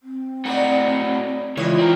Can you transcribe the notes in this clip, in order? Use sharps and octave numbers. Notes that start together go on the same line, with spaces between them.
C4
A2 D#4 F#4 A#4 D5
C#2 E3 F4 C#5 D#5
C4 A#4